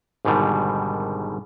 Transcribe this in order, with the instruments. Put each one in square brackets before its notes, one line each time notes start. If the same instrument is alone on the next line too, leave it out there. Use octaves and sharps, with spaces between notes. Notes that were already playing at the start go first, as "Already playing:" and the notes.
[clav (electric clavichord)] G#1 G#2 B2 D3 D#3 G3